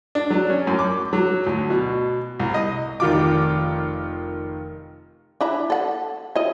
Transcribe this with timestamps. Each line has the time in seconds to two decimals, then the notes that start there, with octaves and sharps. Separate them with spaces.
0.15 D4
0.30 F#3
0.50 C#4
0.67 F#2
0.79 D6
1.13 F#3
1.46 D2
1.70 B2
2.40 C2
2.54 D#5
3.00 F1 D#3 F4 D6
5.41 D4 E4 A#5
5.70 A4 F#5
6.36 E4 D#5